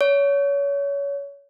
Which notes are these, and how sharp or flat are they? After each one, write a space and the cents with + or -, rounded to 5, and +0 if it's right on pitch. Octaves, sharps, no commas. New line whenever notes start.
C#5 +25